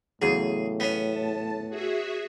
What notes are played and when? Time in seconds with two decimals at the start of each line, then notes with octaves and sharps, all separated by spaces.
0.22 E2 A2 C#3 F#3 G#4
0.80 B3 C#4
1.09 A5
1.69 F#4 G#4 E5